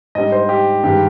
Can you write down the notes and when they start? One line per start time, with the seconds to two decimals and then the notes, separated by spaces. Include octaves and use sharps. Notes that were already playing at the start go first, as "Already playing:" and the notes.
0.15 G#2 G3 D4 D#5
0.32 C5
0.49 G4
0.83 G2 D#3 G#3 G4